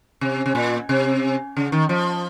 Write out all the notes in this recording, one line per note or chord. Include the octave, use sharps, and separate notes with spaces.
C3
C3
A#2
C3
C#3
D#3
F3